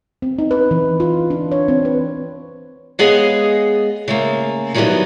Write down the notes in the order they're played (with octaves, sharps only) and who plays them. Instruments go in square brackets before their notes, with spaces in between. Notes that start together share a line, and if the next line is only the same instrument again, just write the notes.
[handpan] C4
D#4
B4
E3
F4
D4
C#5
C4
B4
[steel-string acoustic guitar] G#3 B3 G#4 C#5 D#5 F5
C#3 A3 A#3
D#3 E3 F#3 G3 B3 D#4